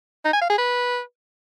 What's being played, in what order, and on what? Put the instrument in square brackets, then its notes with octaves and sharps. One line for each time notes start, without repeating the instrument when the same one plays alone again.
[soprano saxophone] D#4
G#5
F5
G#4
B4